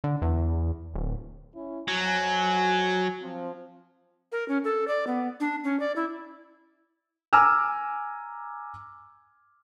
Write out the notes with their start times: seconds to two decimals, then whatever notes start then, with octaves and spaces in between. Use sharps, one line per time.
0.04 D3
0.22 E2
0.94 D1
1.54 C#4 E4
1.88 F2 F#3 G#5
3.21 F3 C4
4.32 A#4
4.48 C#4
4.64 A4
4.88 D5
5.07 B3
5.40 D4
5.64 C#4
5.80 D5
5.96 E4
7.33 G#5 A#5 D6 E6 F6